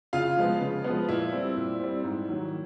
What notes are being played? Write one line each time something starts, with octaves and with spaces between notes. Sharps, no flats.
C#3 F4 F5
F3 G#3 B3
C#3
F3 G#3 B3
A#2 E4 E5
G3 C4
A#2
G3 C4
G#2
D#3 F#3